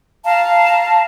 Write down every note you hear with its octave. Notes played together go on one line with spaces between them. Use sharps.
F5 A5 A#5